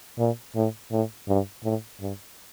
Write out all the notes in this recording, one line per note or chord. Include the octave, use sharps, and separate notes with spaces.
A#2
A2
A2
G2
A2
G2